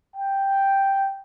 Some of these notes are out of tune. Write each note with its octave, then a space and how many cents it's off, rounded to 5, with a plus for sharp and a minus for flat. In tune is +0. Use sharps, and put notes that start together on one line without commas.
G5 +0